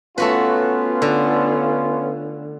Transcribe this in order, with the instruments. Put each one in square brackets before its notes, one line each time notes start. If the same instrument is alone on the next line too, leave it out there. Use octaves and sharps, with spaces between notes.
[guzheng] A3 F#4 B4 [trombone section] B3 C#4 F4
[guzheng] D3